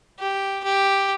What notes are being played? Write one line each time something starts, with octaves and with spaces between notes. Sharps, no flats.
G4
G4